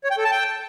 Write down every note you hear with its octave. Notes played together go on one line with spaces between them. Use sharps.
C#5
G5
A4
A5
G5